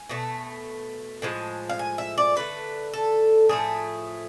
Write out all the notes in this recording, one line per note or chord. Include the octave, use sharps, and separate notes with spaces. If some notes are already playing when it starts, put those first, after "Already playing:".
Already playing: G#5
B2 A3
A2 F3 G#3
F5
G#5
E5
D5
D3 A3 B4
A4
A2 F3 A3 G#4